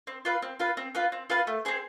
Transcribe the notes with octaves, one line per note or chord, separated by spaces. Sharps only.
C4
F4 B4 F5
C4
F4 B4 F5
C4
F4 B4 F5
C4
F4 B4 F5
A3
C4 G#4 C5